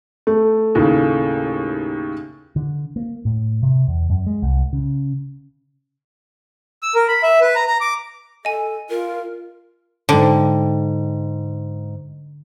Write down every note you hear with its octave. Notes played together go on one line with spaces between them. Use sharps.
A3
D#2 A2 C#3
D3
A#3
A2
C3
E2
F#2
G#3
C2
C#3
E6
A#4
B5
E5
B4
A#5
A#5
D6
A4 D#5 G#5
F4 A#4
G#2 D3 G5